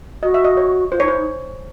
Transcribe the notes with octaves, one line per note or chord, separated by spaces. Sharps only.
F#4 D#5
E5
D#5
C#5
F4 C5
D#4 C#5
E4 C5
D#4